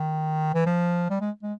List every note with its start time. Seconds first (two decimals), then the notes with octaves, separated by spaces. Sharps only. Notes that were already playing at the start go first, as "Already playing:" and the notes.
Already playing: D#3
0.54 E3
0.66 F3
1.10 G3
1.20 G#3
1.43 G#3